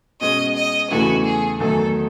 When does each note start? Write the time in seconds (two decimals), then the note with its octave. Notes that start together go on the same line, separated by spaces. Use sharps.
0.21 B2 G#3 C#4 D#5
0.56 D#5
0.91 E2 C#3 E3 A3 E4 F#4
1.25 G#4
1.60 E2 D#3 F#3 A3 A4